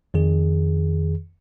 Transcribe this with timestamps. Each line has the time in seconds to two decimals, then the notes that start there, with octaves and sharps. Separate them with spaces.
0.14 F2 D#3 G#4